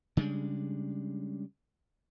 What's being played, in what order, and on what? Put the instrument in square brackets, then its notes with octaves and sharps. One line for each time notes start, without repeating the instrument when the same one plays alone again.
[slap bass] C#3 G3 G#3 D4